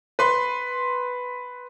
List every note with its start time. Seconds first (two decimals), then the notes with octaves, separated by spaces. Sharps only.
0.19 B4 C6